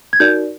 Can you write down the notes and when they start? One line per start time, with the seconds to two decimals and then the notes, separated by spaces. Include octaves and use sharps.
0.13 G#6
0.20 D#4 F#4 A#4 D5 G6